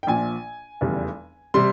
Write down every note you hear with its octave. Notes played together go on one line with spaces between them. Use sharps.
G5
A#1 A#2 F3 G#5
F1 E2 C#3 G3
C3 G3 C6